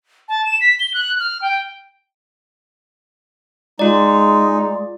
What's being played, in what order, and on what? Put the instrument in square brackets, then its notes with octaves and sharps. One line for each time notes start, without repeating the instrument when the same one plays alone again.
[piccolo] A5
E7
B6
G7
F#6
F6
G5
[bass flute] G#3 [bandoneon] D#4 [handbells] F4 D5